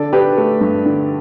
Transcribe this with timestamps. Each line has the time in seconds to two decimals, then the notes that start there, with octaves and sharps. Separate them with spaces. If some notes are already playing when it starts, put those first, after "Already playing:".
Already playing: D3 A4 D5
0.13 D4 G4 B4
0.38 A3
0.61 G2
0.86 D3